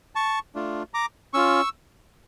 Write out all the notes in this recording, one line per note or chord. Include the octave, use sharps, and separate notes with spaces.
A5 C#6
A3 D4 F4
A#5 D6
C#4 F4 C#6 E6